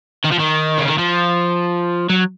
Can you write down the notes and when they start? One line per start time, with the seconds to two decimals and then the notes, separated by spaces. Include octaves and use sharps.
0.25 D#3
0.32 F3
0.40 D#3
0.79 C#3
0.88 D#3
0.99 F3
2.09 F#3